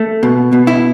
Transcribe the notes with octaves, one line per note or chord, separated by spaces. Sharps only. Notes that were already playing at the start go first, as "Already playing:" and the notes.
Already playing: A3
B2
B2
E4